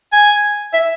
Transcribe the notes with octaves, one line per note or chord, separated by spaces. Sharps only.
G#5
E5